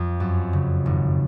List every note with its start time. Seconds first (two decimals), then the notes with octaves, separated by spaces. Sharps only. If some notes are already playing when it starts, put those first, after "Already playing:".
Already playing: F2 C4
0.20 F#2
0.53 C#3
0.86 G#1